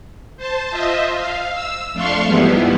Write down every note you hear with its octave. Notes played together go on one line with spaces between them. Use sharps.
C5 A5
F4 C5 D#5 E5
F5
E6
F2 A3 D4 F5 C6 C#6
E2 G#2 F3 G3 B3 E4